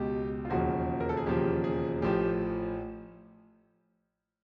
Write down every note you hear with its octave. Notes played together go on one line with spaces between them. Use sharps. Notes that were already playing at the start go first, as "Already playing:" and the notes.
Already playing: C#2 B2 G4
F4
E1 D#2 C#3 F3 F#4
A#4
A4
G#4
E1 D#2 C#3 F3 G4
G#4
A1 A2 F3 G4